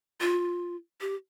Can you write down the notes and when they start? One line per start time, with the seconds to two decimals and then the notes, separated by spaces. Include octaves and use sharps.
0.21 F4
1.01 G4